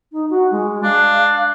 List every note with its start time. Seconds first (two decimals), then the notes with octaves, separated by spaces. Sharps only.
0.12 D#4
0.30 F#4
0.51 G#3
0.83 D4 F5